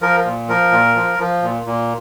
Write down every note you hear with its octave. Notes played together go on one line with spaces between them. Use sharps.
F3 A#4
A#2
F3 A#4
A#2
F3
F3
A#2
A#2